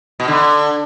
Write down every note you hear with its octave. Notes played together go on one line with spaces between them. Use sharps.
B2
D3